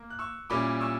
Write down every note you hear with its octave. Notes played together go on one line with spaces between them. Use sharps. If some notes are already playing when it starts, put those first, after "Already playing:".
Already playing: A#3
F#6
C#6 E6
A#2 G3 C#4 E4 B5 D6
C#6 E6